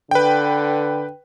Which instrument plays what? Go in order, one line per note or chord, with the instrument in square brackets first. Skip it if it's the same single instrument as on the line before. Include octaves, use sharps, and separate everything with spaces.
[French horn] D3 [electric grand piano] B4 G5